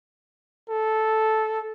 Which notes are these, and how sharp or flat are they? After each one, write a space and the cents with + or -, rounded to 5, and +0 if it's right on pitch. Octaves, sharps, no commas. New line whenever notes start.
A4 -10